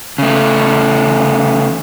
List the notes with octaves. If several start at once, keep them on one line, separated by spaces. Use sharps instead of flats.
C#3 A3